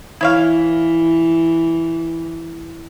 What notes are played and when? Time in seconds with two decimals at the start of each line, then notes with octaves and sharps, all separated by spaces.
0.21 E3 E4 C#5 F5